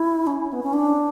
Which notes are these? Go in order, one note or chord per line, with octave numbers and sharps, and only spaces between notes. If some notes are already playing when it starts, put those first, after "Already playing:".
Already playing: E4
C#4
B3
C#4
D4